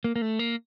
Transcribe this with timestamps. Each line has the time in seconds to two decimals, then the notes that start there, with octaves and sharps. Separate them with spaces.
0.04 A#3
0.16 A#3
0.22 A3
0.39 A#3